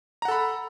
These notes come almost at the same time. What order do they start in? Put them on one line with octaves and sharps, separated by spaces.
A#5 F#5 A4 B5